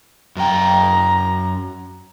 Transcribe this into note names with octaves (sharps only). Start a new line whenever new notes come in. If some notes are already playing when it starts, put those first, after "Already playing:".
F#2 G5 A#5